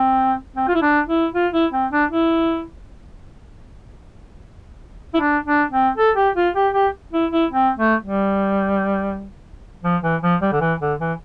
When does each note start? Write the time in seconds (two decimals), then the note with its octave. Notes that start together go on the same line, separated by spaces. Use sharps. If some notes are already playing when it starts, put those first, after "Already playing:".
Already playing: C4
0.56 C4
0.68 F4
0.75 E4
0.82 D4
1.08 E4
1.34 F4
1.53 E4
1.73 C4
1.91 D4
2.10 E4
5.14 E4
5.20 D4
5.46 D4
5.71 C4
5.97 A4
6.16 G4
6.36 F4
6.55 G4
6.74 G4
7.13 E4
7.32 E4
7.52 C4
7.77 A3
8.03 G3
9.83 F3
10.03 E3
10.22 F3
10.42 G3
10.52 D3
10.61 E3
10.80 D3
11.00 E3